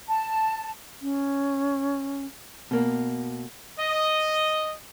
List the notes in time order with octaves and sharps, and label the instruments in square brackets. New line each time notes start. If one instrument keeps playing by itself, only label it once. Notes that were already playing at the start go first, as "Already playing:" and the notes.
[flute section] A5
[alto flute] C#4
[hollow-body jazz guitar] B2 A#3
[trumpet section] D#5